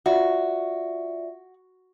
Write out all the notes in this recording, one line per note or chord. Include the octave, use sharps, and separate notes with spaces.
F4 F#4 D5 E5